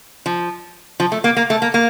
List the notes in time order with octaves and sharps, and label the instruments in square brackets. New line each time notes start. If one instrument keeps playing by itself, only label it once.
[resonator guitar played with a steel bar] F3
F3
A3
A#3
A#3
A3
A#3
A#3